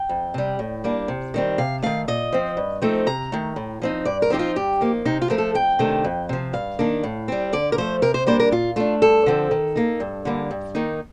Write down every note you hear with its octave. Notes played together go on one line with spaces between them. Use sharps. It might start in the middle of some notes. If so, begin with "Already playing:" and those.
Already playing: G5
F2
C3 G3
A2
G3 A#3 D4
C3
D#3 G3 C4
C3 F5
D#3 A3 F5
A#2 D#5
F3 C4
G2
F3 A3 C4 D#4
C3 A#5
D#3 A3
A2
F3 C4 D#4
G2 D5
A#4
F3 C4 D#4 G4
F4
G2 G4
F3 A#3 D#4
C3 D#4
F4
F3 A3 A#4
A4
F2 G5
C3 D#3 A3 D4
F2
C3 F3
G2 F5
D#3 A#3 D4
A2
G3 C4
D3 D5
A#4
F3 A3 C5
C3 A#4
C5
G3 A#3 D4 C5
A#4
A#2 F4
A3 D4 F4
G2 A4
D3 F3 C4
D#3
A#3 D#4
G2
D3 G3 A#3
G2
D#3 A#3 D#4